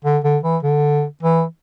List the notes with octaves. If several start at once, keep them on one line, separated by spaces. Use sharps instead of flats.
D3
D3
E3
D3
E3